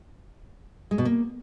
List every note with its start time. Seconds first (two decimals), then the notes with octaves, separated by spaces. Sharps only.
0.91 G#3
0.98 B2
1.05 A#3